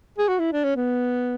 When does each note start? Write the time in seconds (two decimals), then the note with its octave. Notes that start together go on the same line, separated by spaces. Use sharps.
0.18 G#4
0.28 F#4
0.39 E4
0.53 D4
0.64 C#4
0.76 B3